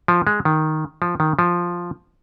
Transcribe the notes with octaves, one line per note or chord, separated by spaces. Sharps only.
F3
G#3
D#3
F3
D#3
F3